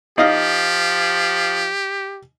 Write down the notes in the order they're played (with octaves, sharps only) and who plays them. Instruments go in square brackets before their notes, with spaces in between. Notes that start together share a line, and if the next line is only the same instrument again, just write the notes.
[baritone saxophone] F3 [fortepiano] D#4 D#5 F5 [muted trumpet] G4